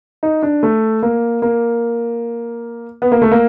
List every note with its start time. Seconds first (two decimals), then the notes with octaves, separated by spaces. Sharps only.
0.23 D#4
0.43 D4
0.63 A3
1.03 A#3
1.42 A#3
3.02 B3
3.12 A#3
3.22 A3
3.32 A#3